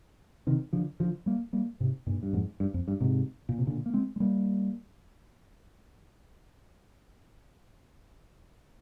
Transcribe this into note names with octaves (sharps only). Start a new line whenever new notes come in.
C3 D#3
D3 F3
D3 F3
G3 A#3
G3 A#3
G#2 C3
G2 A#2
G2
F2 G#2
G2
F2
G2
G#2 C3
A#2
C3
A#2 D3
A#3
G#3 C4
G#3
G3 A#3